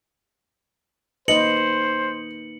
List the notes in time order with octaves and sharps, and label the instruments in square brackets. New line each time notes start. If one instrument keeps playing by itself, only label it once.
[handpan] A#3 D#4 B4 [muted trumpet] C5 [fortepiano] D#5 [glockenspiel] C#7 F#7